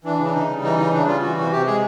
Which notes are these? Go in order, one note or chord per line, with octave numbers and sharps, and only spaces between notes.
E3 D4
C#3
D4
C#3 D#4
G3
E3 D#4
C#3 D#4
C#3 D4
G3 F4
E3 F#4
C3 F#4
C3 G4
G#3 G#4